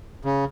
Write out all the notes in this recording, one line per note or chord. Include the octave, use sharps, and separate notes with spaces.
C#3